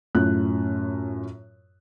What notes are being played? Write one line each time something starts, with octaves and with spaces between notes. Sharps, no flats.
F#2 A2 F4 F#6